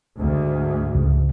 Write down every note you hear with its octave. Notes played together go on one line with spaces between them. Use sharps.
D2 G#2
C#2